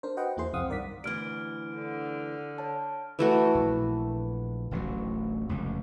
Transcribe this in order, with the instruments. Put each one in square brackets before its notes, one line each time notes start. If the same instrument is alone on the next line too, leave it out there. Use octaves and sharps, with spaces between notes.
[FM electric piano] D4 A#4 C5
F#4 B4 C5 D#5 F#5 G5
E2 A#3 E4 G#4 C5 C6
C2 F2 C4 F5 F#5 D#6
G2 D#3 A#4 D5 F#5 B6
[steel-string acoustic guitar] D2 E3 [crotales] F6 D7
[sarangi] D3
[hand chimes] C#5 A5
[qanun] E3 A3 F#4
[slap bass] A#1
D1 A1 F#3
F1 C#2